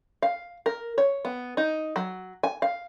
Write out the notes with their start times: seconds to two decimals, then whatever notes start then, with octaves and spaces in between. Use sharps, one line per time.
0.22 F5
0.66 A#4
0.98 C#5
1.25 B3
1.57 D#4
1.96 F#3
2.43 G#5
2.62 F5